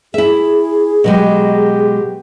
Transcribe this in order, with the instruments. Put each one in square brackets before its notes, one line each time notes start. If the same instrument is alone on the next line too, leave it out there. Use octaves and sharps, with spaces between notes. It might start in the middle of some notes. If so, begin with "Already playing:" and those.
[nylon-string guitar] E4 E5 [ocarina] G#4
[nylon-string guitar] B2 F#3 G#3 [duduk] G4